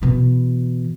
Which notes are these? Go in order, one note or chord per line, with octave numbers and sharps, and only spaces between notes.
B2 E3